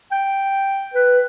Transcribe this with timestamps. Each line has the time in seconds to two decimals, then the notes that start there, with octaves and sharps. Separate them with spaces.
0.12 G5
0.94 B4